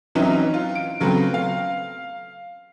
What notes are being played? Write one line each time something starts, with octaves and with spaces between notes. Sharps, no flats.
E3 F#3 C4 C#4 D#4 E4
F4
D7
C#3 F#3 A3 B3 C4
F5